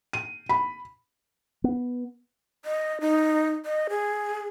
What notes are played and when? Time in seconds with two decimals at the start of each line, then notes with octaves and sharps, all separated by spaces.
0.13 D#7
0.49 B5
1.64 B3
2.65 D#5
3.01 D#4
3.66 D#5
3.90 G#4